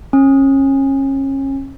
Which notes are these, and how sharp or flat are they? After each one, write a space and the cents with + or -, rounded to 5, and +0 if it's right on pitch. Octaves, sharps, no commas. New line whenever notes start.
C#4 -30